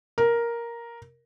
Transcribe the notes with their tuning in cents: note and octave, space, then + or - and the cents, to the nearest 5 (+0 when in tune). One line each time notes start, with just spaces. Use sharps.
A#4 +5